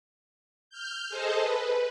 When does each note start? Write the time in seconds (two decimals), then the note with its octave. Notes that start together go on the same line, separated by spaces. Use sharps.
0.70 F6 G6
1.09 G#4 A4 C5 D#5 A5
1.39 B4